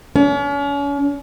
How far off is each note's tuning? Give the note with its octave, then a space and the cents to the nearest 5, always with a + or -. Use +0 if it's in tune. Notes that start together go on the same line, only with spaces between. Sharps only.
C#4 +40